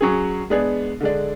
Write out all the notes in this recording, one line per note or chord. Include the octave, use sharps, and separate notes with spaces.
F#3 C#4 G#4
G#3 B3 D4 G#4
D3 G#3 D4